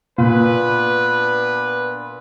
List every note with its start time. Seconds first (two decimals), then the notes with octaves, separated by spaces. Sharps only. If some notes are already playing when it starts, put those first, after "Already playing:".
0.18 A#2 B3 D4 B4